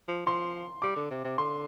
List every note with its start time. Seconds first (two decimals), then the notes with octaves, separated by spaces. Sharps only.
0.08 F3
0.26 F3 C6
0.82 G3 D6
0.96 D3
1.11 C3
1.24 C3
1.38 D3 C6